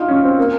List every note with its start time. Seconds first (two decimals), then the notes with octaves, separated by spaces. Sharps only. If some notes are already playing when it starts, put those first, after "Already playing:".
Already playing: D#4 F4
0.08 C#4
0.23 C4
0.38 A#3